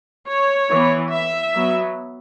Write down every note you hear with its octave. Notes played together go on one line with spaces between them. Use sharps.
C#5
E3 B3
E5
F#3 B3